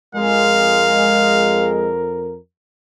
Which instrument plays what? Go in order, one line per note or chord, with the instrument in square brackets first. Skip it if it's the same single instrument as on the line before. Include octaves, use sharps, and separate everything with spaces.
[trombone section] F2 A#4 [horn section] G#3 [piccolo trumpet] F5